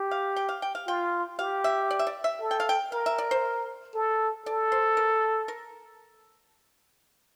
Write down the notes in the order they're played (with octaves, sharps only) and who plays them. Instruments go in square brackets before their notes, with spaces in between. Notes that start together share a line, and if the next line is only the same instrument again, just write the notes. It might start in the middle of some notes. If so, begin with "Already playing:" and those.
Already playing: [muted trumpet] G4
[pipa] F5
G5
F5
G5
F5
[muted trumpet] F4 [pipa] G5
[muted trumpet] G4 [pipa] F5
[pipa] E5
D5
E5
D5
E5
[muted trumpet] A4
[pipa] G5
F5
G5
[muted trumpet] A#4 [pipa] F5
[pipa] E5
D5
C5
[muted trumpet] A4
[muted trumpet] A4 [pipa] D5
[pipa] C5
A#4
A#4